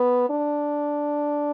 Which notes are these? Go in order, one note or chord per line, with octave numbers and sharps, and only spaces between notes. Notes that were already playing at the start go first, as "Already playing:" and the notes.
Already playing: B3
D4